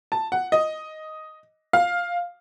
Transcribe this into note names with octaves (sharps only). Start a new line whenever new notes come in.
A5
F#5
D#5
F5